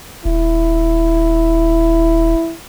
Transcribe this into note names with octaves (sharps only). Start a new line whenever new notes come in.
D#1 E4